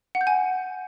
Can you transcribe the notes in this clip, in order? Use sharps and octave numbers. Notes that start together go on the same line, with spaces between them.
F#5
G6
G#5